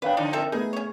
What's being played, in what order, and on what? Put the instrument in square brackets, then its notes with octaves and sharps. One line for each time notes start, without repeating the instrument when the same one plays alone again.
[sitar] B3 D4 [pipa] B4 [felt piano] C#5 F5 G5
[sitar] D3 F3 D#4 [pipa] D4
[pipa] C4 A4 E5 [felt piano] A#4
[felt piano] A3 B3 B4 [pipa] D#4 [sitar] G#4
[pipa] C#4 C#5